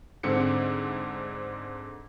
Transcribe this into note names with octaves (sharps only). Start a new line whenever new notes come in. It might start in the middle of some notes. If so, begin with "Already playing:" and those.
G#2 D3 C4 C#7